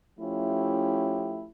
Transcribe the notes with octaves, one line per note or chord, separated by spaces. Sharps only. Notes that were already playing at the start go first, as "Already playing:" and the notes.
F3 A3 C#4 E4 G4